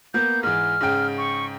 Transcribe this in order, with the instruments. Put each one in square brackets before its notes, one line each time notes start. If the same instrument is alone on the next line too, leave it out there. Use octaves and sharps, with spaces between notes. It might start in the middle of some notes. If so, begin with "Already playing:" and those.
[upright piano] A#3 B3 [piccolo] G6
[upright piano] G#2 E3 [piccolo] F6
[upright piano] G#2 C#3 G5
[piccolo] C#6